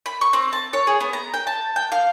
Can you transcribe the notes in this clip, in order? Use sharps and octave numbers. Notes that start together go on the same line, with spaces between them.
B5
C#6
C4
A5
C#5
G#4
B3
A#5
G5
A5
G5
F5